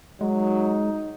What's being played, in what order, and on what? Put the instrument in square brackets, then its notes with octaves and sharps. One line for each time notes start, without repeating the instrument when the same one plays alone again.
[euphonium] F#3 [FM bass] G#3 [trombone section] D#4